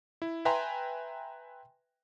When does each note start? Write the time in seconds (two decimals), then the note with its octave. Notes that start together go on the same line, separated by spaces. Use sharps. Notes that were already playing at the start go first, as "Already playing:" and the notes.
0.22 E4
0.45 B4 E5 G5 G#5 A#5 C6